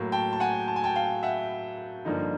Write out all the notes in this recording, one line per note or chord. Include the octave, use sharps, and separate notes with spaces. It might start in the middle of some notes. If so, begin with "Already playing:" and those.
Already playing: A2 F#3 A#3
G5 A5
A5
F#5 G#5
A5
G#5
G5 A5
F5 G5
E5 F#5
G2 D3 F3 A#3 D#4